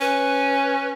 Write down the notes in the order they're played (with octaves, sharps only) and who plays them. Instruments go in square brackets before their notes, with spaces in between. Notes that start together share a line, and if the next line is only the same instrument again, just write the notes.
[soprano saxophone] C#4 [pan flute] B4